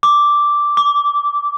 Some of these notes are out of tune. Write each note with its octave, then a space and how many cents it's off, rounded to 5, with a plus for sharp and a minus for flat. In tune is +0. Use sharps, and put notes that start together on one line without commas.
D6 -5
D6 -20